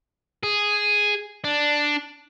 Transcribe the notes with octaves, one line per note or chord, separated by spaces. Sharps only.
G#4
D4